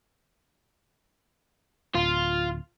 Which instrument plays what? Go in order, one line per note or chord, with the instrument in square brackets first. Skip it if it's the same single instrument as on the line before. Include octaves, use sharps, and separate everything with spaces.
[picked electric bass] D1 [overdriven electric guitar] F4